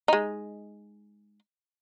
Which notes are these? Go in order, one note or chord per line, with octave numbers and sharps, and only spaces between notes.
G#3 D#4